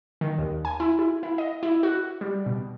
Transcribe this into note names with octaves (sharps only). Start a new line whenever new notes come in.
D#3
D#2
G#5
E4
E4
E4
D#5
E4
F#4
G3
B2